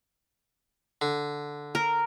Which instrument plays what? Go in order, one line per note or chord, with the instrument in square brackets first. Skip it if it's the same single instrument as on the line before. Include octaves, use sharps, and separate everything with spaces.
[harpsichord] D3
[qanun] A#4